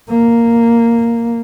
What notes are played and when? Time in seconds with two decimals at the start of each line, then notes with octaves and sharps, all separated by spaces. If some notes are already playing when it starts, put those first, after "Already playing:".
0.10 A#3